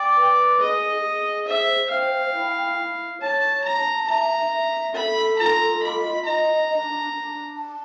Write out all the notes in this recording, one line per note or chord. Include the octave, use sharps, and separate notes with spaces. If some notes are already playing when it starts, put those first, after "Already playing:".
Already playing: D5 G5
B4
G#4 D#5
G#4
C5 E5
F5 G5
E4
E4
C#5 A5
A5 A#5
E5 A#5
E5
A4 B5
F4 A#5
D#5 B5
D#5 A#5
D4
D4
A5